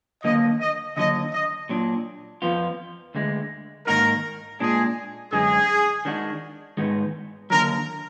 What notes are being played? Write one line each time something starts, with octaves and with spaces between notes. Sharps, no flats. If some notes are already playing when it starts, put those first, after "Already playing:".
D#2 D3 F#3 A#3 D#5
D#5
D#2 D3 F#3 D#5
D#5
A#2 F#3 D4
F2 F3 B3 F4
D2 D3 G#3
G#2 D#3 A#3 D#4 F#4 A#4
A#2 G#3 D4 G#4
F#2 D3 G#3 G#4
D#3 G#3 D4 F#4
G#2 D#3 G#3 B3
D#2 D3 F#3 A#4